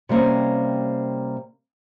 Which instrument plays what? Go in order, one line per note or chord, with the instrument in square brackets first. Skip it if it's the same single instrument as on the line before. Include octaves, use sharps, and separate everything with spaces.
[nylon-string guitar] C3 G3 A#3 C4 C#4